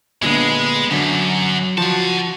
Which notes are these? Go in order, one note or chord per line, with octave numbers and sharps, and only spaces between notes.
A#2 D3 G#3 B3
F#2 D3 F#3
F3 F#4 F#5 A5